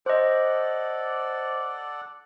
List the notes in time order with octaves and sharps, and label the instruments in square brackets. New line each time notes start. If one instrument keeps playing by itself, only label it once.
[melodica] A4 D5 F#5 [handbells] C5 D#5